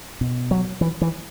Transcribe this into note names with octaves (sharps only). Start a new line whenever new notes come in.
B2
F#3
E3
E3